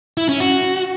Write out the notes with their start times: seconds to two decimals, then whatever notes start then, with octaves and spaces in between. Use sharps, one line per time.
0.17 E4
0.29 C#4
0.40 F#4